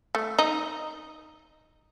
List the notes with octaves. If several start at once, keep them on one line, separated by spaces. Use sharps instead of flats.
A3
D#4